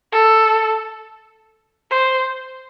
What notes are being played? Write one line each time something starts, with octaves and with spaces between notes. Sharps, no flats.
A4
C5